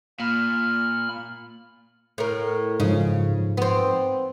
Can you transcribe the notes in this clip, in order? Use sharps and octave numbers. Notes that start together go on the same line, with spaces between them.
A#2 A#3 B5 F6
A2 A#4
G#2 C#3 F3
B3 C4